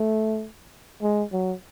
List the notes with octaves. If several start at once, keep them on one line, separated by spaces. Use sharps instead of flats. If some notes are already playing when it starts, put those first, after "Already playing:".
Already playing: A3
G#3
F#3